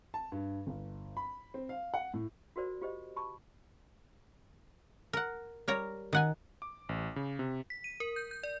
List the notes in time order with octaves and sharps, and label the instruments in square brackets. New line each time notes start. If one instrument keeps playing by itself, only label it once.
[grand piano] A5
G2
G1
B5
C4
F5
F#5
A2
[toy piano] F4 F#4 A#4 C5 D5
F4 G4 C5 D#5
A5 B5 C#6
[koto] A#4 F#5
G3 A#4 C#5 A#5
D#3 F#5 G#5
[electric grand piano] D6
A1
C#3
C3
[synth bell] B6
D#7
A#4
G6
G6
D5